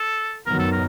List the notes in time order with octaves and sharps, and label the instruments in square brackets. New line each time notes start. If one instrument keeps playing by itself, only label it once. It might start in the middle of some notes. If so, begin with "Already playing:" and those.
Already playing: [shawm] A4
[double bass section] F#2 D#3 F#3 B3 [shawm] A#4
[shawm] A4
A#4